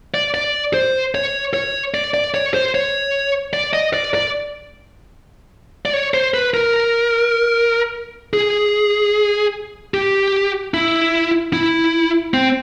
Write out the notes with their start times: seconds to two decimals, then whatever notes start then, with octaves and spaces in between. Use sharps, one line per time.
0.14 D5
0.34 D5
0.74 C5
1.15 C#5
1.54 C#5
1.94 D5
2.14 D5
2.34 C#5
2.54 C5
2.75 C#5
3.53 D5
3.73 D#5
3.94 D5
4.14 D5
5.85 D5
5.93 C#5
6.14 C5
6.34 B4
6.54 A#4
8.33 G#4
9.94 G4
10.74 E4
11.53 E4
12.34 C4